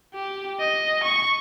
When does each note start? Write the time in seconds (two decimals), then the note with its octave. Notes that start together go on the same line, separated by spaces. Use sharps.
0.14 G4
0.60 D#5
1.03 C#6